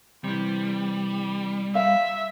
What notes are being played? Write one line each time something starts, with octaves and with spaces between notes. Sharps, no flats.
C3 E3 G3
E5 F5